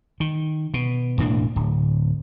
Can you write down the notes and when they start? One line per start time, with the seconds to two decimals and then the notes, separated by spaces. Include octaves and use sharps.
0.20 D#3
0.74 B2
1.18 E1 A2 A#3 D4
1.56 D1